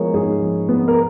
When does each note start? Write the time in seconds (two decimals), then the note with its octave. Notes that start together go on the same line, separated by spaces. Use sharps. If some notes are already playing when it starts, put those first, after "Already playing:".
Already playing: F3 G#3 B3 A#4 C#5
0.14 G#2 G#4
0.41 F3
0.69 B3
0.88 A#4